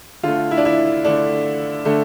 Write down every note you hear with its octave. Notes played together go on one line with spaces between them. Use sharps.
D3 A3 F4
E4
D4
E4
D3 A3 D4
D3 A3